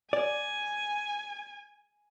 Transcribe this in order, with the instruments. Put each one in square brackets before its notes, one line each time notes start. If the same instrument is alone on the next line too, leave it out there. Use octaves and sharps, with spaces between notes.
[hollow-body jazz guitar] D5 [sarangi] G#5